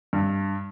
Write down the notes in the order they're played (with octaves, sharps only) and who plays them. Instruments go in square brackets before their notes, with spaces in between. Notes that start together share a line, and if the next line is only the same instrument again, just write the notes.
[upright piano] G2